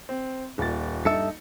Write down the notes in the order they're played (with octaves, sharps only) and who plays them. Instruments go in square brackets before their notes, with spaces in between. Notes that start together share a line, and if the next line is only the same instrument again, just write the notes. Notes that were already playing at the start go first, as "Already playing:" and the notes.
[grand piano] C4
D#1 A#2 A6
[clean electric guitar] G2 A4 E5 [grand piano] D#4 C#7